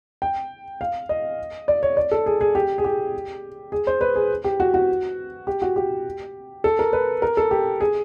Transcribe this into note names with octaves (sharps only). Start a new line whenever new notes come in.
G5
F5
D#5
D5
C#5
D5
A4
G#4
G#4
G4
G#4
G4
G#4
C5
B4
G#4
G4
F#4
F#4
G4
F#4
G4
A4
A#4
B4
A#4
A4
G4
G#4